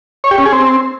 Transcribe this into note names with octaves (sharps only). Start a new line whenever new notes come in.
C#5
G4
C#4
G#4
C4